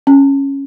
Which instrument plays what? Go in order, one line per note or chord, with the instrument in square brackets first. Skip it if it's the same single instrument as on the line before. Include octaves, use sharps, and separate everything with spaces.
[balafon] C#4